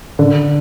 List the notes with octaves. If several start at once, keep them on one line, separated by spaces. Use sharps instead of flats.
D3